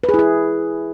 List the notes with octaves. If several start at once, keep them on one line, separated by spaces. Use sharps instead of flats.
B4
G#4
E4
G#4